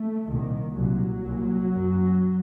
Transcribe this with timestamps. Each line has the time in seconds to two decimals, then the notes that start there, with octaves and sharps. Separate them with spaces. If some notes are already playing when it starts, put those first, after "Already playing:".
Already playing: A3
0.27 C2 A#2 D#3
0.75 C2 A#2 F#3
1.24 C2 A#2
1.73 F#2